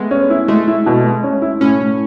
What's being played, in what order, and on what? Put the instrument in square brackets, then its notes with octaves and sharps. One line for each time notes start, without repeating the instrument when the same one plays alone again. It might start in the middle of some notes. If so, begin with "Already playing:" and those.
Already playing: [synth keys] G#3 A3 B3
[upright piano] C#4
E4
[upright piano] G#3 [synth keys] A3
[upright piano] E4
B2
G#3
C#4
E4
[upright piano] A2 [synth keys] C#4
[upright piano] A2